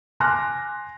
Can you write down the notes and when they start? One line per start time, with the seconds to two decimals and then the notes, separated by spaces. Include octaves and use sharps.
0.20 G#5 C6 D6 F6 F#6 A#6